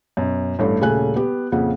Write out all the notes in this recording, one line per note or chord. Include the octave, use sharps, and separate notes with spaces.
F#2 B2
A1 G2 A3
D#1 C#3 A3 G#5 F#6
B3 G4
F2 A#2 C#3 F#5